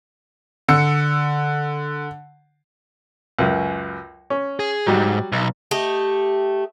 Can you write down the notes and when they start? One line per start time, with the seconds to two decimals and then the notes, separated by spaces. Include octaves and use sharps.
0.68 D3 E6 C#7
3.39 C#2 F#2
4.30 C#4
4.60 G#4
4.87 G#2 F#3 G3
5.32 B1
5.71 A3 G4 D#5